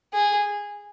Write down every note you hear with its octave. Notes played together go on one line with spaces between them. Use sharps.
G#4